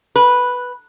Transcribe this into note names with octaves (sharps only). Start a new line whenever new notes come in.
B4